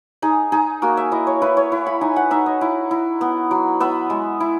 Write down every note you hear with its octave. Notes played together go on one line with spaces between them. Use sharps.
D#4 G#4
D#4 G#4
A#3 F#4
E5
E4 D#5
C#5
E4 B4
C#5
E4
B5
D#4 G#5
F#5
D#4 E5
D#5
E4
E4
B3
F#3
B3 E5
G#3
E4